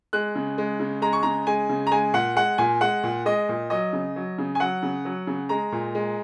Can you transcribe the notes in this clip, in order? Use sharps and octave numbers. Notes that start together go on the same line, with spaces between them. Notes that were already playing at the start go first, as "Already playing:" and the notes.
G#3 F#6
C#3
G#3
C#3
G#3 A#5
C#6
C#3 A#5
G#3 G#5
C#3
A#5
G#3 G#5
A#2 F#5
G#3 F#5
A#2 G#5
G#3 F#5
A#2
G#3 D#5
A#2
F#3 D#5
C#3
F#3
C#3
G#5
F#3 F#5
C#3
F#3
C#3
G#3 A#5
A#2
G#3